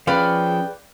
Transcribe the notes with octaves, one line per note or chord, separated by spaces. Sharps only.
F3 C#4 G#4 B4 D5 F5 G5 B5